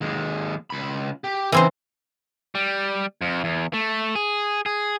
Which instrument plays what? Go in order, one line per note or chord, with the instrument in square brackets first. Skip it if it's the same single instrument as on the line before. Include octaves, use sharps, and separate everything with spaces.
[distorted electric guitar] D#2 G#3
C#2 B5
G4
[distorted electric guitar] C#3 D#4 [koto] E3 C4 C5
[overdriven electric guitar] G3
F2
E2
A3
G#4
G#4